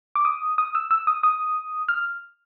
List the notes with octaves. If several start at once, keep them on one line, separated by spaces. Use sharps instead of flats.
D6
D#6
D#6
E6
E6
D#6
D#6
F6